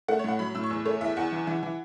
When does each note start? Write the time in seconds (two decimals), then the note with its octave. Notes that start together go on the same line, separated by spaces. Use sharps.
0.08 A3 F#5
0.19 C#5
0.24 A2 F#5
0.39 F#3 B5
0.55 A2 E6
0.64 C#6
0.70 E2 E6
0.85 A3 C#5
1.01 E2 E5
1.17 E2 F#5
1.32 E3
1.47 E3
1.63 E3